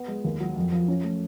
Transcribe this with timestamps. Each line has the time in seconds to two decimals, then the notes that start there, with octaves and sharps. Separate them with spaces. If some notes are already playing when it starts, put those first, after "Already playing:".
Already playing: B3
0.08 G#3
0.24 D#2
0.40 F#3
0.56 F2
0.72 F3
0.88 C#4
1.04 A3